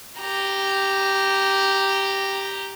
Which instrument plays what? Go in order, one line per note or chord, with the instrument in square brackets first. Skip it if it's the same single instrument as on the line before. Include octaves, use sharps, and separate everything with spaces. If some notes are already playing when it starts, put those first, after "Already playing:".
[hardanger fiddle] G4 A#5